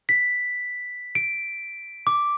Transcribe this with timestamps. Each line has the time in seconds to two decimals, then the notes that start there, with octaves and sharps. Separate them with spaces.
0.09 B6
1.15 D7
2.07 D6